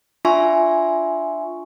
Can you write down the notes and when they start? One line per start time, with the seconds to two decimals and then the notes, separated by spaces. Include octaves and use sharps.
0.25 D4 F4 E5 G#5 C6 C#6